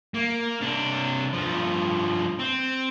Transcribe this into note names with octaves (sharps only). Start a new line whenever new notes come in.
A#3
C3 D4
G2 F3
C4